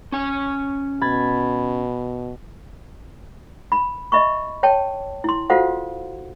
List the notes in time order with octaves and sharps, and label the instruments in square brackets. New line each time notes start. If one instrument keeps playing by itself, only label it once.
[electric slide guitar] C#4 G#5
[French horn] B2 [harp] B5 G#6 A6
[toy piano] B5
D#5 E5 B5 C#6
C#5 G5 A5
E4 C6
F4 F#4 A4 C5 F5 F#5